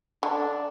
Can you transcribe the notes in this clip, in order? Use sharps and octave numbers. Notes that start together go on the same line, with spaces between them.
D3 D4